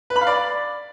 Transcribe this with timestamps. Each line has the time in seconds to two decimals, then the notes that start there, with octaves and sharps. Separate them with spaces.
0.10 B4
0.16 B5
0.21 F5
0.27 D5